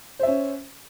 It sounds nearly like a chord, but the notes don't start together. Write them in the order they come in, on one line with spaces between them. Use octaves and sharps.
C5 E5 C#4